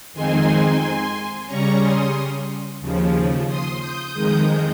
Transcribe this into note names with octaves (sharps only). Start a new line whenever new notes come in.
F2 D#3 G#3 C4 D#4 G#5 C6
C#3 G3 C#4 A#5 C#6
C6 D#6
D#2 C#3 F3
C6 D#6
D#6 G6
F2 D#3 G#3 D#6 G6